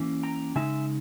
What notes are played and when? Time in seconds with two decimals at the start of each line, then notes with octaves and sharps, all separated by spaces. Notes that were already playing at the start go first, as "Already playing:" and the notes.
Already playing: E3 A#3 C#4
0.23 G5 A#5
0.56 C#3 G#3 D#4 E5 G#5